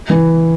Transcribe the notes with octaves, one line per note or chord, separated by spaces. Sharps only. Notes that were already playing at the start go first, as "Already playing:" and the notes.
E3